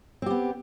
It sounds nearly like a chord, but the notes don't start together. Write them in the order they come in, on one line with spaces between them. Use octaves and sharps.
C4 G4 B3